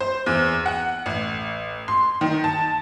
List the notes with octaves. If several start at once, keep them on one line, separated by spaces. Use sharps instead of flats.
C5
E2
F#5
A1
C6
D#3
A5